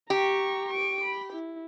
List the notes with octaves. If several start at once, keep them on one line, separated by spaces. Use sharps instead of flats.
G4 A#5 C#6
C#6 D7
B5
E4